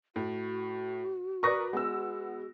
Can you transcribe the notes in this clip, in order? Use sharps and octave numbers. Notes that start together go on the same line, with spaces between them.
A2 F#4
A#4 B4 D5 C#6 D#6 A#6
G#3 B3 E6